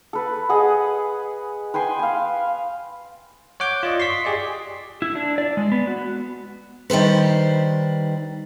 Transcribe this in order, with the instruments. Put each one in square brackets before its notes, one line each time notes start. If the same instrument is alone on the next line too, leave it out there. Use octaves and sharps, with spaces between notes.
[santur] A4 B4
G#4 B4 D#5 F#5
B4 G5 G#5 C6
F5 G#5
[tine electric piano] C#5 F#5 D6 G6
F4 D5 D#5
C6 C#6 B6
G4 G#4 D5 D#5
[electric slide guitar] E4
D4
D5
G#3
B3
F#4
[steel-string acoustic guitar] D#3 G3 B4 C5